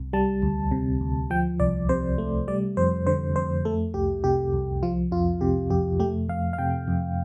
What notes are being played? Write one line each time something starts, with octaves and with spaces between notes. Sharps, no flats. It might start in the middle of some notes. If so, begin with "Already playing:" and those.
Already playing: C2 C3
G3 A5
D2
C3
D2
F3 G5
C2 D5
C3 C5
A3
G3 D5
F2 C5
D3 C5
F2 C5
A3 A4
C2 G4
C3 G4
C2
F3 F4
F2 F4
C3 G4
F2 G4
A3 G4
F2 F5
F5
C3 G5
F2